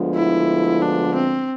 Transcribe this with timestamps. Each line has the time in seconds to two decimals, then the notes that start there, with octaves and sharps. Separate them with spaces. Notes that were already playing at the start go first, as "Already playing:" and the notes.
Already playing: D2 D3 F3 G#3 B3
0.15 E4
0.83 D4
1.15 C4